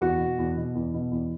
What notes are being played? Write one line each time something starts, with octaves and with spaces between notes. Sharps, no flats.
E2 F#4
B2
E2
B2
E2
B2
E2